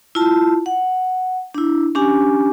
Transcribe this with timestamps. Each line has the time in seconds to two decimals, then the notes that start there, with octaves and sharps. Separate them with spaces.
0.15 E4 F4 A5
0.66 F#5
1.54 D4 E4
1.95 C#4 D4 G4 G#5